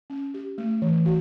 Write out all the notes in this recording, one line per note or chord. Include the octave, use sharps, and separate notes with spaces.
C#4
G4
A3
E3
F#4